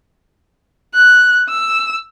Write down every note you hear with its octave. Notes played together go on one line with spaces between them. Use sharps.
F#6
E6